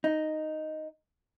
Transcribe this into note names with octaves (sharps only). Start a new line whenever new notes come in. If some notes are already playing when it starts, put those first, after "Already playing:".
D#4